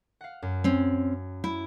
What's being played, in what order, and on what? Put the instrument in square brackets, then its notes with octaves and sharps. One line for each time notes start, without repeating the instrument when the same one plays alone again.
[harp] F5 F#5
F#2
[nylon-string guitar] C4 C#4
E4